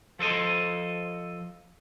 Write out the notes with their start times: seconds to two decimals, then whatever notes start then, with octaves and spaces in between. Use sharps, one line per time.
0.19 F3 A4 C5 D#5